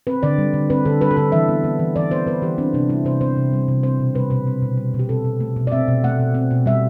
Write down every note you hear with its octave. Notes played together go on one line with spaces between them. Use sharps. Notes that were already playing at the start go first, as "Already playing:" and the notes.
C4 B4
D3 D5
G3
D3
C4 B4
D3 A4
G3 B4
A4
D3 B4
E3 E5
B3
B3
E3
E3 D5
B3 C5
B3 B4
E3 G4
C4 D4
C3 D4
G3 E4
C3 C5
C4 C5
C3
G3
C3
C4 C5
B2
G3 B4
B2 B4
C4
B2
G3
B2
G4
C4 A4
B2
A3
B2
D5
C4 E5
B2
A3 F#5
B2
C4
B2
G3 E5